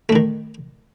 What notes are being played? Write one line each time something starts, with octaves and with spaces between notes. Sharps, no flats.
D#3 A3 D4